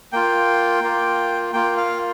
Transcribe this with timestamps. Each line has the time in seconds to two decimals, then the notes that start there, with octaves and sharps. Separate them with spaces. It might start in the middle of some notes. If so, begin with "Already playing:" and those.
0.12 A#3 F4 G5
0.83 A#3 F4
1.53 A#3 F4 G5
1.77 F5